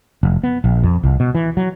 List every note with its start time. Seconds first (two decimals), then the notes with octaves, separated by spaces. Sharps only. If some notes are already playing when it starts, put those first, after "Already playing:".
0.23 F1
0.43 B3
0.64 A#1
0.83 F2
1.04 C2
1.20 B2
1.35 E3
1.57 F#3